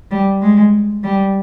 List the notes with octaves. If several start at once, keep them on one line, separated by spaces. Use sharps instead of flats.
G3
G#3
G3